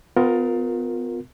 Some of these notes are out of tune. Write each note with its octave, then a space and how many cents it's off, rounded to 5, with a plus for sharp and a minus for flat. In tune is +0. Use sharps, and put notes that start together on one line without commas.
B3 +35 F4 +25 A#4 +0